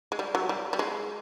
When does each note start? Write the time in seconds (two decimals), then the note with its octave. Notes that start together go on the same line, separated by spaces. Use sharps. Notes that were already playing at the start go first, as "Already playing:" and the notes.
0.12 G#3
0.19 G3
0.35 F#3
0.49 G3
0.73 G3
0.79 G#3